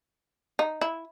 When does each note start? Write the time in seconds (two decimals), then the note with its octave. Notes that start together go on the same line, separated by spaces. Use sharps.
0.59 D#4
0.81 E4